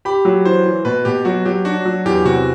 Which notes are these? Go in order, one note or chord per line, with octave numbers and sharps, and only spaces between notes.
G4 B5
F#3 B5
E3 C5
E3
B2 B4
B2 G4
F#3 F#4
F#3 G4
D4 F#4
F#3
E2 G4
C3 F#4